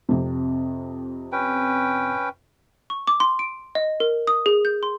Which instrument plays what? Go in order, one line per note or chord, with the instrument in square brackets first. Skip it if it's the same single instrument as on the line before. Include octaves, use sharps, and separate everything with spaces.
[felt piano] F2 C3
[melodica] C#4 B4 G5
[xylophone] C#6
D6
C6
D7
D#5
A#4
D#6
G#4
G6
C6